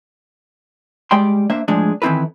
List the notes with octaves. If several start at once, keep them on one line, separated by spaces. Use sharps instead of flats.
G3 G#3 D5 G5 C6
A#3 D4 C5 E5
A2 F3 G#3 D4 G#4
D#3 E3 C4 E4 A4 B4